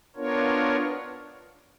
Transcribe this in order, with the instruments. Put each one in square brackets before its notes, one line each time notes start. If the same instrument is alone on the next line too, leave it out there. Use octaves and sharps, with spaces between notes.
[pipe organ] B3 D4 F4 A#4 C#5